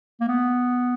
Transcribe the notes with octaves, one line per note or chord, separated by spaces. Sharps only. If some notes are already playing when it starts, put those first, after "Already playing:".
A#3
B3